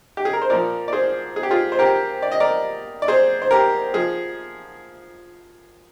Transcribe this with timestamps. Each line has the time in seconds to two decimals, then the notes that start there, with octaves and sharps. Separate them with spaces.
0.17 G4
0.25 G#4
0.33 A#4
0.42 C5
0.50 A#2 F3 A#4 D5
0.88 D5
0.93 G#4 C5
1.36 G#4
1.43 G4
1.51 F4 G#4
1.72 C5
1.79 G4 A#4
2.22 D5
2.31 D#5
2.40 A#4 D5
3.02 D5
3.08 G#4 C5
3.42 C5
3.51 G4 A#4
3.94 F3 G#4